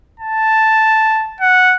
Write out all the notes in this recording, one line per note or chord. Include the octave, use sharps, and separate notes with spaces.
A5
F#5